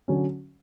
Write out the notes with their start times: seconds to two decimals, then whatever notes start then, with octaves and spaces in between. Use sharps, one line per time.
0.08 D3 F#3 C#4